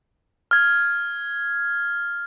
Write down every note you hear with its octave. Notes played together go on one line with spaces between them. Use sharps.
F6 G#6